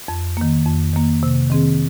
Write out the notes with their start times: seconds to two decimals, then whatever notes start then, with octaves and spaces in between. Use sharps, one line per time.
0.08 F2
0.37 D#3 A#3
0.66 F2
0.93 D#3 A#3
1.23 C3
1.50 D#3 C4 G#4